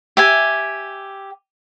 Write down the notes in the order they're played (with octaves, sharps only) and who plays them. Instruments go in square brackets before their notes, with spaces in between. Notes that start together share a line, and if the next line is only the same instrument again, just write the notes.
[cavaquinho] G4 E5 G#5